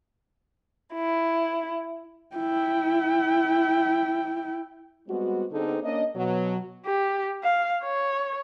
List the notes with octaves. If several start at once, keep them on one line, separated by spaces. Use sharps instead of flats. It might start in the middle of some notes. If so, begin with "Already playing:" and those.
E4
E4 G5
G3 G#3 B3 C4 F#4
D3 B3 C4 D#4 G#4 A4
A#3 C#4 D4 D#5
B2 F#3
G4
F5
C#5